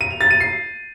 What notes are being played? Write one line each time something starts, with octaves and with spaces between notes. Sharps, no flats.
D#7
F7
A6
D#7
C7